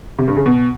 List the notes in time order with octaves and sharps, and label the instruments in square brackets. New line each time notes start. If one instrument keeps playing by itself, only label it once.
[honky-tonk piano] C3
G2
C#3
B2